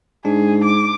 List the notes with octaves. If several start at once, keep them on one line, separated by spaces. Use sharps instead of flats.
G#2 D4 G#4
D6